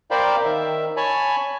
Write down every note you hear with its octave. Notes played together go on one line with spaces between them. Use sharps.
A#4 C5 D5 F5 G5 B5
D#3 E5
C#5 G#5 A5 B5